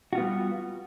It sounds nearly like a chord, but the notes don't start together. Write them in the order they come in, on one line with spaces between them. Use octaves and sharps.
F#4 F4 B3 G3